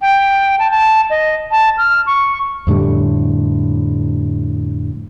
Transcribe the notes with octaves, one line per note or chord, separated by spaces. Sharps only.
G5
A5
A5
D#5
A5
F6
C#6
F2 A2 D3 G3